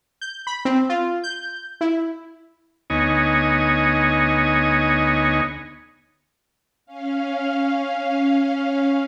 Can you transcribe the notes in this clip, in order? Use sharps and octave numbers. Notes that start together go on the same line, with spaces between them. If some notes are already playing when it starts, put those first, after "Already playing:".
G6
B5
C4
F4
G6
E4
D2 B3 D#4 C#5 D#5 G#5
C#4 F5